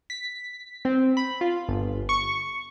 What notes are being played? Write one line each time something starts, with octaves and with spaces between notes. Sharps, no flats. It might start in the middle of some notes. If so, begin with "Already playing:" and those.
B6
C4
B5
F4
G1
C#6